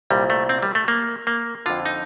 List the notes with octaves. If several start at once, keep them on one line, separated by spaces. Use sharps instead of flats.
C2 A#2 G3
A3
C4
G3
A3
A#3
A#3
F2 D3 F4
D#4